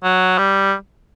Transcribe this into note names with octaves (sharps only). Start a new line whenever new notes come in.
F#3
G3